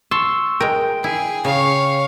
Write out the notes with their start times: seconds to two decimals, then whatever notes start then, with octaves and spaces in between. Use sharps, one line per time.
0.11 A5 C6 C#6 E6
0.60 G#3 A#4 G5
1.04 E4 G#4
1.45 C#3 C#5 F5